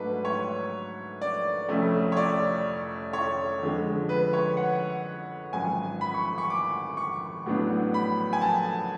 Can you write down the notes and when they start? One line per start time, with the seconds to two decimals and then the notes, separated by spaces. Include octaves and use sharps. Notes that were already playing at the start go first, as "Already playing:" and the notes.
Already playing: G#2 F#3 A3 D4 B4
0.25 C#5
1.21 D5
1.69 F1 F2 F3 A3 C#4
2.12 C#5
2.17 D5
3.13 C#5
3.61 F2 D3 F3 G#3
4.09 B4
4.33 C#5
4.57 F#5
5.53 G#1 F#2 F3 G#5
6.01 B5
6.14 C#6
6.38 C#6
6.50 D6
6.97 C#6
7.46 A1 A2 F#3 B3 D4
7.94 B5
8.33 G#5
8.41 A5